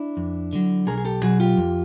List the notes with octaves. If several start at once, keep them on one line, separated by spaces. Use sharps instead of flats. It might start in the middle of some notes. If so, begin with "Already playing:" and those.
Already playing: D4 E4
F2
D3 F#3
B1 G#4 A#4
G#4
G4 A4
B2 F#3 F#4 G#4
F4 G4
F2